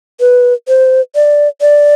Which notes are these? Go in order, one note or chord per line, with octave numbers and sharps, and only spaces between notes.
B4
C5
D5
D5